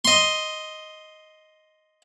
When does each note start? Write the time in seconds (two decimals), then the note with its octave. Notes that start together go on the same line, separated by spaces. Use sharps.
0.05 D#5 C6